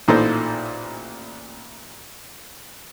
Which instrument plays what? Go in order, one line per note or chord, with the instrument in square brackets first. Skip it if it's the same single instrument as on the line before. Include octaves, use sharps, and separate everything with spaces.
[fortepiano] A1 A#2 D#4 E4 A4 C5